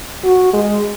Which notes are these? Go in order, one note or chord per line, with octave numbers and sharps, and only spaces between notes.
F#4
G#3